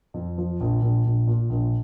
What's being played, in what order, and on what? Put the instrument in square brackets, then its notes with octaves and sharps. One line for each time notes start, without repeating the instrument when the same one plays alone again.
[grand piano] F2
F3
A#1
A#1
A#1
A#2
A#1